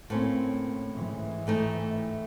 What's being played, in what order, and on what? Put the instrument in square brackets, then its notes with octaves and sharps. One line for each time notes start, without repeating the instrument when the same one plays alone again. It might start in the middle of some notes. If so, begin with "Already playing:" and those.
[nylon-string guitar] A2 C#4 [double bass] A#3 C4
[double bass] G#2 E3
[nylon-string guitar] A2 A3 D#4